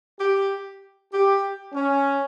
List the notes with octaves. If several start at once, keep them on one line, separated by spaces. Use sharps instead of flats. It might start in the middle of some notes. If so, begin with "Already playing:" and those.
G4
G4
C#4